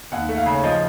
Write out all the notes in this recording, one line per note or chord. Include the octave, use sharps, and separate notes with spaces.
D#2 F#5
A3
F5
C#3
C#5
F3 D#5